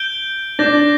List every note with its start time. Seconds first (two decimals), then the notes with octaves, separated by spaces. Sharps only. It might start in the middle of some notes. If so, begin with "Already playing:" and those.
Already playing: G6 D7 G7
0.59 D4 D6 G6 A#6